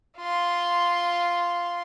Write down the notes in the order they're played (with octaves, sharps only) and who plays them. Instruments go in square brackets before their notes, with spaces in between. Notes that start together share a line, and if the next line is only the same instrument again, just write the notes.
[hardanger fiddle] F4 C6